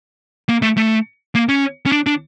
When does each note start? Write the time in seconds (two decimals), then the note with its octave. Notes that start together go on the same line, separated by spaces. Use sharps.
0.49 A#3
0.62 A3
0.77 A3
1.35 A#3
1.49 C#4
1.86 C#4
1.92 D4
2.07 D4